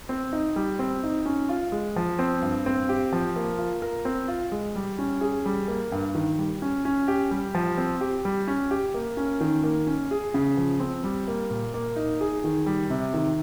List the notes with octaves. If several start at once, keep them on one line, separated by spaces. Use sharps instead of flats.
C4
D#4
G3
C4
D#4
C#4
F4
G#3
F3
C4
G2
C4
G4
F3
A#3
F4
A#4
C4
F4
G#3
G3
C#4
G#4
G3
A#3
G2
D#3
G3
C#4
C#4
G4
G3
F3
C4
G4
G3
C#4
G4
A#3
C#4
D#3
A#3
C#4
G#4
C#3
F3
C4
G3
A#3
A#2
A#3
D#4
G#4
D#3
G3
C3
D#3